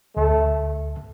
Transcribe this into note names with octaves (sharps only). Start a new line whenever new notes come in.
D2 A3